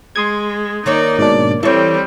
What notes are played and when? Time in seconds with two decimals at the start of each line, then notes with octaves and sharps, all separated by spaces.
0.16 G#3 C6 D#6 G#6
0.86 D#3 A#3 D#4 C#5 D5
1.19 G#2 B2 D4 D5
1.63 E3 G3 C4 A4 C#5